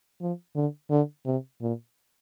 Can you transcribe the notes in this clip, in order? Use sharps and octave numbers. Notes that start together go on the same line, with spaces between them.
F3
D3
D3
C3
A#2